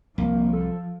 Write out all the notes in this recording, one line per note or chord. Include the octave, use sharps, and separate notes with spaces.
C2 F3 A#3
A4